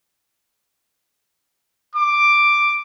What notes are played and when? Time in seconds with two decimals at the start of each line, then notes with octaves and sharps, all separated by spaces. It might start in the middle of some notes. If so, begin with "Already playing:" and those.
1.95 D6